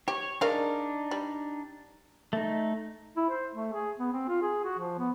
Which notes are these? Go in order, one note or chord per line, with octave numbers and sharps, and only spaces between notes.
G4 C#5
G#3 D4 D#4 A#4 F5
G3
A3 D#4
E4
C5
A3
G#4
B3
C4
F4
G#4
F#4
F3
B3